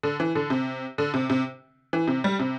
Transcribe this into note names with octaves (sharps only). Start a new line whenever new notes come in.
D3
E3
D3
C3
D3
C3
C3
E3
C3
G3
C3